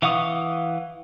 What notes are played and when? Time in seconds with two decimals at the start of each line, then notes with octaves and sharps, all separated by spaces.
0.02 E3 F5 F#5 C#6 D#6